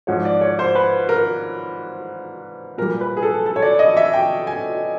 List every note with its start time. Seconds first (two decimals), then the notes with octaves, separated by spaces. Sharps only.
0.07 G#2 F3 C#5
0.25 D5
0.41 C#5
0.59 C5
0.75 B4
1.09 A#4
2.78 A#2 A#4
2.82 G3
3.01 B4
3.17 G#4
3.23 A4
3.46 A4
3.56 C#5
3.62 D5
3.79 D#5
3.97 E5
4.13 G5
4.47 G#5